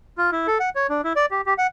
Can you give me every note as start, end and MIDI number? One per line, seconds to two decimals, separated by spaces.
0.18 0.30 65
0.32 0.47 64
0.47 0.58 69
0.60 0.70 78
0.75 0.87 73
0.89 1.01 62
1.04 1.13 64
1.16 1.26 74
1.31 1.41 67
1.46 1.54 67
1.58 1.67 78